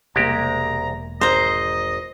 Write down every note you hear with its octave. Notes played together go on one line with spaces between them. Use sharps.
E1 C2 G#3 A#3 G4 A#5
G#1 C5 D#5 A#5